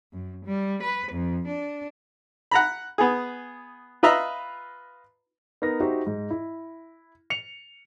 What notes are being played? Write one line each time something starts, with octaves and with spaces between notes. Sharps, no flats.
F#2
G3
B4
F2
D4
F#5 A#5 B5
B3 G#4
F4 B4 D#5 E5 A#5 B5
B3 D#4 A#4 A#6
D#4 F#4 G4 C5 E5
G#2
E4
C#7 F7